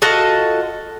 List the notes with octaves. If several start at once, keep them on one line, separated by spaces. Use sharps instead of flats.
F4 F#4 A4 D#5